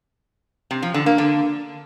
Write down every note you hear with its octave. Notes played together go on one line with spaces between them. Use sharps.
C3
F3
D3
A#3
D3